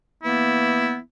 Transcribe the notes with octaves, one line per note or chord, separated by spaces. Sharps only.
E3 A#3 B3 E4